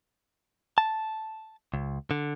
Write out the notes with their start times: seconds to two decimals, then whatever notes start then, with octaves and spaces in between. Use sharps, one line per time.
0.78 A5
1.74 C#2
2.11 D3